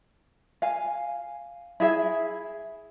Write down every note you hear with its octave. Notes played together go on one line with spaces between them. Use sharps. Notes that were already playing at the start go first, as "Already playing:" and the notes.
F5 G#5
E4 G#4 E5